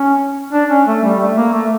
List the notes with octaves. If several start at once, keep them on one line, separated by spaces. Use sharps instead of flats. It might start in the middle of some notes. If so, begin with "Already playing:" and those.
Already playing: C#4
D4
C#4
A3
G3
A3
A#3
A3